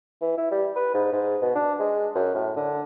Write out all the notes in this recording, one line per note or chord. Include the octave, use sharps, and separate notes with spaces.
E3
E4
G3
B4
G#2
G#2
B2
D4
G#3
F#2
A2
D3